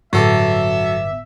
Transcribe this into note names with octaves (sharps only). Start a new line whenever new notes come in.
G1 A2 F#3 B3 A4 E5 D6